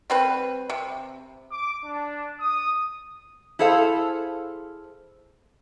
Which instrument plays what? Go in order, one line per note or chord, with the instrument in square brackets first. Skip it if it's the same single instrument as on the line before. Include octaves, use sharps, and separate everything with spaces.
[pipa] G3 C4 B4
C3
[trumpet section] D6
D4
D#6
[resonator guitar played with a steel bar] E4 G#4 A4 C5 F5